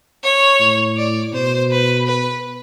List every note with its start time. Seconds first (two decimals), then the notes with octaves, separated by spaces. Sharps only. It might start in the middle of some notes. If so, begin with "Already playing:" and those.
0.23 C#5
0.60 A2
0.97 D5
1.33 B2 C5
1.71 B4
2.07 B4